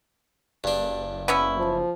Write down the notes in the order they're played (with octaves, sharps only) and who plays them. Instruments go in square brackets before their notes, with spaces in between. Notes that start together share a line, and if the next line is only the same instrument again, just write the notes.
[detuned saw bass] F#1 [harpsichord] G2 D4
[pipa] B3 C#4 E4
[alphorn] F3